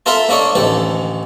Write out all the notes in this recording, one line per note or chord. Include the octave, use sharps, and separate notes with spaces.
F4 A4 A#4 E5 B5 C6
A#3 D4 A4 C#5 D#5
A1 D2 D#3 A4